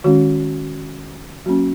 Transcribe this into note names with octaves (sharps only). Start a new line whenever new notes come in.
D#3 G#3 C#4 F#4
F#3 A#3 C#4 F#4